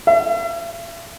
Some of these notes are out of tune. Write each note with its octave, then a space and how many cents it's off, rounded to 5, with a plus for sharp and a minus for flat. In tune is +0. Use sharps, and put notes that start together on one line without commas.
E5 +45